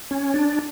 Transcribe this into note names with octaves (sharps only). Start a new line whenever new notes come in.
C#4
D4